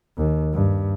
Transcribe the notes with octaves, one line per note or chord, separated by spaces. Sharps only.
D#2
G2